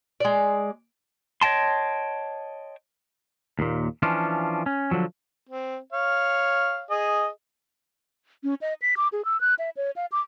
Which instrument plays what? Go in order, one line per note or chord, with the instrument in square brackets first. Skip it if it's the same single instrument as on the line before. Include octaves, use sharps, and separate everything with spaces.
[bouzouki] G#3 D5
[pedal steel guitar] C#5 D#5 G5 A5 C6
[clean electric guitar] D#2 A#2
E3 F3 C#4 D4 F4
C#4
D3 F3 F#3
[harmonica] C4
C#5 F5
G#4 D#5
[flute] C#4
D#5
B6
D6
G#4
E6
F#6
E5
C#5
F5
D6